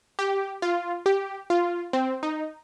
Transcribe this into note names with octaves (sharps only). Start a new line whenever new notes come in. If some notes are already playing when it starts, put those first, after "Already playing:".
G4
F4
G4
F4
C4
D#4